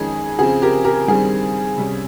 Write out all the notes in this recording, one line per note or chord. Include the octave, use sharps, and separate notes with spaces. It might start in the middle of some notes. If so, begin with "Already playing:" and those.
Already playing: F2 D#3 G#3 C#4 G#4
C#3 F3 C4 G#4
G4 A#4
G4 A#4
G2 D#3 G3 C4 G#4
C3 G3 C#4